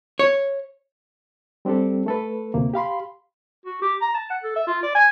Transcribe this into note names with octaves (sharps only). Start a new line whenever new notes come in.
C#5
G3 C4 D4 G4 A4
A3 A4 B4
D2 C3 A#3
G4 F5 B5 C6
F#4
G4
A#5
A5
F#5
A4
E5
F4
D5
G#5